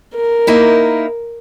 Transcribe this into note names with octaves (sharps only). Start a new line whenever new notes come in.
A#4
A#3 D#4 E4